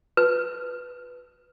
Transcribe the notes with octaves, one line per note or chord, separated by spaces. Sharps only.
B4